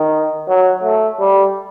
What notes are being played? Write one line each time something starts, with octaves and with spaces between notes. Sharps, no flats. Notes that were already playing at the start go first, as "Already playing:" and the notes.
Already playing: D#3
F#3
A3
G3